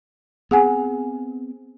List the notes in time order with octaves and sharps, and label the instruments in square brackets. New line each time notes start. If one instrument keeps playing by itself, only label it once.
[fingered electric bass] B3 C4 [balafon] G#4 F#5 G#5